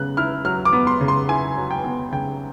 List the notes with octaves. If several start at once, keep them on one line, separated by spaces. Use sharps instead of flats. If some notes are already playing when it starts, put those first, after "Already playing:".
Already playing: C#3 B3 F#6
E4 F6
F#3 F6
D6
B3
C6
C#3
C6
E4 G#5
F#3
G5
B3
C#3 G5